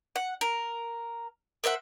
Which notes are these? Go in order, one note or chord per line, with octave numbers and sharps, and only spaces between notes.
F#5
A#4
A#4 C5 E5 F#5